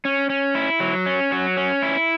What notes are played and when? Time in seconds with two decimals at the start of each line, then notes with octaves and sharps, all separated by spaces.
0.05 C#4
0.30 C#4
0.55 E4
0.80 F#3
1.06 C#4
1.32 F#3
1.57 C#4
1.82 E4